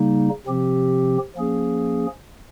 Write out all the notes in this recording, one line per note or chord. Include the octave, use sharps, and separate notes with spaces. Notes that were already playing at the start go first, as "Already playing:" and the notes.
Already playing: C#3 G3 A#3 D#4
C3 F3 C4 G4
F3 A#3 C#4 G#4